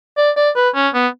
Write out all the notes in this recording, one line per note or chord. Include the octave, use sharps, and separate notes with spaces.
D5
D5
B4
C#4
B3